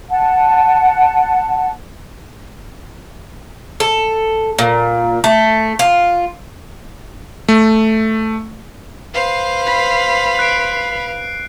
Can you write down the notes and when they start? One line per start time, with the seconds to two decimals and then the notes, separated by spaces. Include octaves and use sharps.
0.10 F#5 A5
3.80 A4
4.59 A#2
5.24 A3
5.79 F4
7.48 A3
9.14 B4 C5 F5
9.66 B5
10.39 F#6 C7 D7